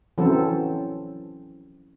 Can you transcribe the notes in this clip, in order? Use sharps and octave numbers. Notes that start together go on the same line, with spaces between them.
E3 F#3 C4 C#4 A4